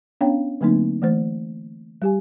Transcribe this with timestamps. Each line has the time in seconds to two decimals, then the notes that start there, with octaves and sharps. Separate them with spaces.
0.21 B3 C#4 D4 C#5 F5 G5
0.61 D3 F#3 A3 A#3 C4 D#4
1.02 E3 A3 C5
2.02 G3 G4 G#5